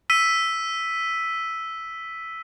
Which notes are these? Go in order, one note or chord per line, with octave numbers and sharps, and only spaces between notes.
E6 B6 D#7